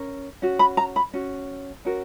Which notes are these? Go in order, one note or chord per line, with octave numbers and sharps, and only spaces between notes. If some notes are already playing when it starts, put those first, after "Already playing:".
Already playing: C#4 A#4
C#4 F#4
B5
A#5
B5
C#4 F#4
C#4 F#4 A#4